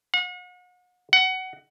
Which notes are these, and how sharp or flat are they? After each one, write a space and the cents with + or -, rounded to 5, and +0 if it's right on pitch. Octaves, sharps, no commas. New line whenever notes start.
F#5 -40
F#5 +20